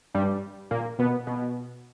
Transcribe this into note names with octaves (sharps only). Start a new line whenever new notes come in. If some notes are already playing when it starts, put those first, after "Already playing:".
G2 G3
A#2 A#3
B2 B3
B2 B3